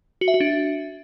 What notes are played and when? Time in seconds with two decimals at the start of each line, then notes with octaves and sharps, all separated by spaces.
0.21 F#4
0.28 E5
0.34 F#4
0.40 D4